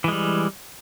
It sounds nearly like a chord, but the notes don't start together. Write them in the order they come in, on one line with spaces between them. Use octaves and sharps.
E3 G#3 G3